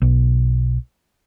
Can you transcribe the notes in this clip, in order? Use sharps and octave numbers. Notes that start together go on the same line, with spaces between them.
B1